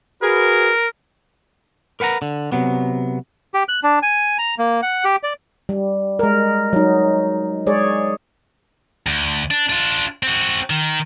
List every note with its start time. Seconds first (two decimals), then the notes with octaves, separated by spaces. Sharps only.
0.22 F#4 G#4 A#4 B4
2.00 A#4 B4 F#5 G#5 A#5
2.22 D3
2.52 C3 F#3 B3
3.54 G4
3.69 F#6
3.83 D4
4.03 G#5
4.38 A#5
4.59 A#3
4.82 F#5
5.04 G4
5.23 D5
5.69 G3
6.19 G#3 A#4
6.73 F#3 D#4
7.66 G#3 G#4 C#5 D5
9.07 D2
9.51 D4
9.69 D4 F4
10.23 C4 F#4
10.70 D#3